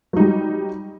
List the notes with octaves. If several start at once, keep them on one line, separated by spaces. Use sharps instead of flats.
F#3 G3 D#4